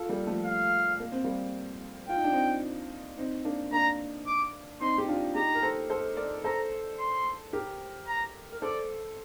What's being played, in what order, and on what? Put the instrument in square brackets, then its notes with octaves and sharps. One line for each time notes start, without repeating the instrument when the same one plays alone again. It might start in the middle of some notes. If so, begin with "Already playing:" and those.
Already playing: [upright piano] F4 A4
G3 A#3
F3 A3
[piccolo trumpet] F5
[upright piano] A#3
C4
G3 A#3
[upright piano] F4 [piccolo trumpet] G5
[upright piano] D#4
D4
C4 D#4
C4 D#4
A#3 D4
[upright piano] A#3 D4 [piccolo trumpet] A#5
[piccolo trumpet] D6
[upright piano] C4 D#4 [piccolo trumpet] C6
[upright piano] G4
D4 F4
[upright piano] D#4 G4 [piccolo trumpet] A#5
[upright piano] A#4
A4 C5
A4 C5
A#4 D5
[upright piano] A4 C5 [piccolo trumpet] A#5
[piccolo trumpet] C6
[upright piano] G4 A#4
[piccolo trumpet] A#5
[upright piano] A#4
[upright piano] A4 C5 [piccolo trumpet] D5